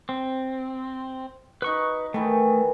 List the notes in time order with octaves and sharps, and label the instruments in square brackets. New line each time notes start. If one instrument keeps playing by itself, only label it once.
[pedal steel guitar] C4
[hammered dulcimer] D#4 F#4 [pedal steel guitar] B4 C#6
[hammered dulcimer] D#3 E3 [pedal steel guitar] A3